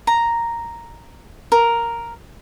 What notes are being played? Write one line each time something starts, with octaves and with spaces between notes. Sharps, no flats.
A#5
A#4